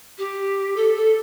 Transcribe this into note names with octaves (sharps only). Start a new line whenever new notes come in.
G4
A4
A4